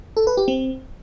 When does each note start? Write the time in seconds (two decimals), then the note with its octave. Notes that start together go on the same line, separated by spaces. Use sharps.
0.17 A4
0.27 B4
0.37 G4
0.48 C4